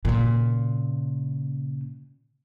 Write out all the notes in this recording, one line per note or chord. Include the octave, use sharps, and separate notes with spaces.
A#2 C#3